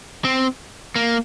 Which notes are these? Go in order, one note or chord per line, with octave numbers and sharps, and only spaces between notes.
C4
A#3